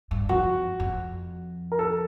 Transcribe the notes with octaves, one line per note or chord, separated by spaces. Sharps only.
G2
F2 F#4
F2
A#4
A4